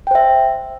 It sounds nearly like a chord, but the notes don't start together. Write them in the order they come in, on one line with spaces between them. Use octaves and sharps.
G5 C5 E5